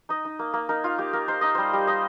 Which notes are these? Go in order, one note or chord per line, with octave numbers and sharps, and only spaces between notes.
D#4 D#5
D#4
A#3
A#3
D#4 A#4
D#4 F4
A#3 G4
A#3 A#4
D#4 C5
D#4 D#5
G3 C5
G3
D#4 D#5